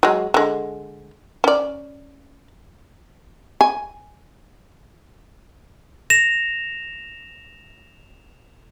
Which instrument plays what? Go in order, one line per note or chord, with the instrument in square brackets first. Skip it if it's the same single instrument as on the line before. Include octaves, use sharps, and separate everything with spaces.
[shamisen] F#3 G#3
D3 G#3
C#4 D5
G#5
[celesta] A#6 [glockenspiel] E7 F7